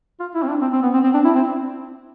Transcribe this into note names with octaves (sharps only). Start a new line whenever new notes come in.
F4
E4
C4
D4
C4
C4
B3
C4
C4
D4
E4
C4